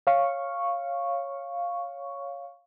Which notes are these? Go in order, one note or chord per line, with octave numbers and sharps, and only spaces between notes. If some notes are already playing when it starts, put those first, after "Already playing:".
C#5 F5 C#6